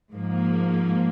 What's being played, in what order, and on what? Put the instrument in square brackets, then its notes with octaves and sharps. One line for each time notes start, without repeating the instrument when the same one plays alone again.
[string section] G#2 F3 A#3